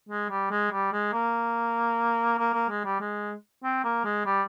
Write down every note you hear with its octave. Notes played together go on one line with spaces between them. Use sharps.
G#3
G3
G#3
G3
G#3
A#3
A#3
A#3
G#3
G3
G#3
C4
A#3
G#3
G3